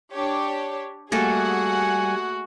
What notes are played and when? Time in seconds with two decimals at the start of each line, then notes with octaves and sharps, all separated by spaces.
0.13 D4 G4 C#5
1.12 G3 A3 A#3 F#4 G#4 A4 F#5 G#5